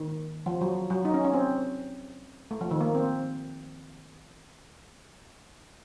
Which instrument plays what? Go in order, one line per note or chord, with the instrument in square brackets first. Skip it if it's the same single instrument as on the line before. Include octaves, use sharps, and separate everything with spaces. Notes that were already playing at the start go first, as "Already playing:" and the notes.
Already playing: [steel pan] D#3
F3
F#3
F#3
D#4
C#4
C#4
C4
A3
F3
D#3
A#3
C4